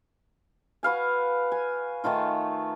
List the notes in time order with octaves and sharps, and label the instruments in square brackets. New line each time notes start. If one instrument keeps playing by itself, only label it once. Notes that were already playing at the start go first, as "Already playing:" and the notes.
[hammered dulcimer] F#4 B4 F5 G#5
G#5
D#3 A3 D#4 F4